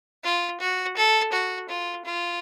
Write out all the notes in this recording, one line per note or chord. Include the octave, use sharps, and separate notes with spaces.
F4
F#4
A4
F#4
F4
F4